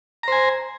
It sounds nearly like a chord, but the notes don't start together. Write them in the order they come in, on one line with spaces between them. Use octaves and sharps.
A#5 C5 G#5